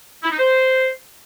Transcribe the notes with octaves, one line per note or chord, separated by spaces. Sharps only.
E4
D#4
C5